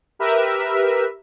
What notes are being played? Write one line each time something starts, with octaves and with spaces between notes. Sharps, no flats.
G4 A#4 B4 E5